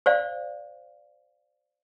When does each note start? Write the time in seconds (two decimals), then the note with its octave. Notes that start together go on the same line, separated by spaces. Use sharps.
0.06 C5 D5 F5